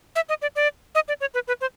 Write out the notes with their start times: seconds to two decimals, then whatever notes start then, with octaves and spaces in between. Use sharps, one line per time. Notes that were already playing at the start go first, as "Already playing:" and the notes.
0.16 E5
0.29 D#5
0.42 D5
0.56 D5
0.95 D#5
1.08 D5
1.21 C#5
1.34 B4
1.48 B4
1.61 C5